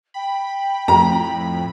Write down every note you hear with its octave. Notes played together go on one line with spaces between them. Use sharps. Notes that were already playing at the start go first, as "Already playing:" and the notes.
G5 B5
F2 A2 A#5 B5